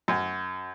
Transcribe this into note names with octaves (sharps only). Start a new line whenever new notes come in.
F#2